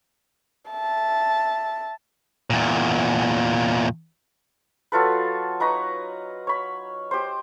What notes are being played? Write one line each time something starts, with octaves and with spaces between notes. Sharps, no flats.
E5 A5
E2 A#2
F#3 F4 A4 B4
D#4 B4 C#5 A#5
C#5 B5
G4 C5